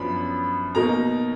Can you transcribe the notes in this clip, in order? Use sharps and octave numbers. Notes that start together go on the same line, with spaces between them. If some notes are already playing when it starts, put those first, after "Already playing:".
Already playing: F#2 F3 B3 D4 B5
B2 A#3 D#4 A#5